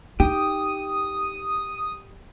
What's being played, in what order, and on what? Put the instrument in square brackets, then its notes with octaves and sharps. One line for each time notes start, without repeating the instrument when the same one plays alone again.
[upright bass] D#4 [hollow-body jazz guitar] G4 [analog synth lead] D#6